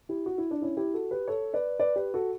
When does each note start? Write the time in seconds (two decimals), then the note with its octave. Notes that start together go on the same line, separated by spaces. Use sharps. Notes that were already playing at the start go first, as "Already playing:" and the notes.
0.09 E4 G4
0.26 F#4
0.38 E4
0.51 D4
0.62 C#4 E4
0.77 E4 G4
0.94 F#4 A4
1.11 G4 B4
1.28 A4 C#5
1.53 B4 D5
1.80 B4 D5
1.96 G4 B4
2.14 F#4 A4